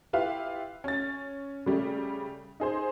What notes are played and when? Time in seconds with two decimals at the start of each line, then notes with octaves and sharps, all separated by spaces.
0.13 E4 F4 G4 B4 E5 F5
0.84 C#4 A6
1.66 C#3 G3 A3
2.60 D#4 G#4 C5